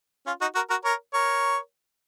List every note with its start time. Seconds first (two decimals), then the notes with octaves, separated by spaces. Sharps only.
0.26 C#4 F4
0.41 D#4 F#4
0.55 F#4 A#4
0.70 F#4 A#4
0.85 A#4 C#5
1.14 A#4 C#5